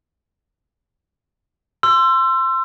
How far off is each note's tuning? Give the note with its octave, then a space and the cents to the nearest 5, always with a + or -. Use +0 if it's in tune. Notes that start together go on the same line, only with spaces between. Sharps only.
C6 +0 E6 +30